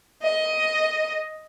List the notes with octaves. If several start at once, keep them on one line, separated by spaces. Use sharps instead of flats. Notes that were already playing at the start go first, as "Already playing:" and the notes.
D#5